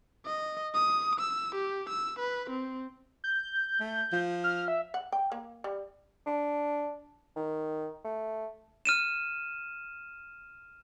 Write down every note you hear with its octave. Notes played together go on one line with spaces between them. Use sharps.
D#5
D#6
E6
G4
E6
B4
C4
G6
A3
F3
F6
E5
F#5
G5
A#3
G3
D4
D#3
A3
F6 D#7 E7